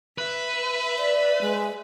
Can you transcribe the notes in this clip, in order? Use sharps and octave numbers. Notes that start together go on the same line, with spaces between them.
B4 E5
D5
G#3